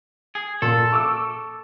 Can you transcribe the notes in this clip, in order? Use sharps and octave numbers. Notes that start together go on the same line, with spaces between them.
G#4
A#2 A4
C#6 D6 E6